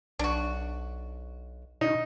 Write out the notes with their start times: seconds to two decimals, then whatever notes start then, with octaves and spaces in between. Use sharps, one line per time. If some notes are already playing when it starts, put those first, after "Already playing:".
0.19 B1 D4 F#4
1.81 B2 D#4